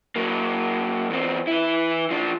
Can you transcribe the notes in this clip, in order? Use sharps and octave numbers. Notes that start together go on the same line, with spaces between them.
F#3 A#3
E2 C4
E3 E4
F3 D4